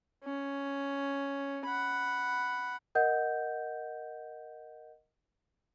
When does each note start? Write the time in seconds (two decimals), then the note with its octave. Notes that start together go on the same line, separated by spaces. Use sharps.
0.24 C#4
1.65 F#5 B5
2.95 A#4 D#5 F#5 G6